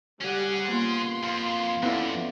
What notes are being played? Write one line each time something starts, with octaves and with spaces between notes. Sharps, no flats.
G3 C#4 G#4 F#5
A#3 B3 F4 C6
F2 F5
F2 B3 C#4 E4 A4 D5